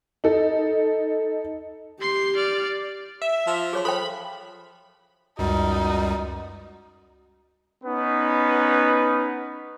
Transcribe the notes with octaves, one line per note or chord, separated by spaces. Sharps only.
D#4 A4
G4 C6 C7
D5 F6
E5
F3
G#4 C#5 C6
A4 C5 G5 B5
C#2 F#2 G3 D#4 F#4
B3 C#4 D#4 B4